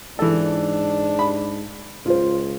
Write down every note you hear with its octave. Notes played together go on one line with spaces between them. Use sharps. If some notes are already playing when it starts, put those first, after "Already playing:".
G#2 E3 D4 A4
B5
C#2 F4 C5